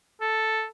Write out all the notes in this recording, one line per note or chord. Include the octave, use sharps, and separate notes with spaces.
A4